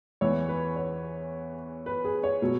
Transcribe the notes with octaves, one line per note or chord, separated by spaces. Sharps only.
E2 E3 C#5
B4
C#5
B4
G#4
C#5
B2 F#3